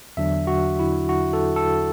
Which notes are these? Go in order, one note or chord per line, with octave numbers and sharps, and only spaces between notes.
E2 D3 F#3 D4 E5
F#4
E4
F#4
A4
A4